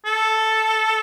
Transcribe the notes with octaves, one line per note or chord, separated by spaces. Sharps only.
A4